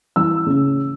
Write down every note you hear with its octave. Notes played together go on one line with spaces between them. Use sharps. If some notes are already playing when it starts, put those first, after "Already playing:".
E3 E6
C#3